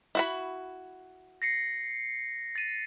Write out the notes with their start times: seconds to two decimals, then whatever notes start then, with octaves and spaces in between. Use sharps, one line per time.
0.15 E4 F#4 B5
1.42 A#6 C7 C#7
2.55 A6 D#7